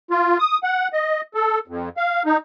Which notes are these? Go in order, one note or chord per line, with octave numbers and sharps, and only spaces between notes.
F4
D#6
F#5
D#5
A4
F2
F5
D#4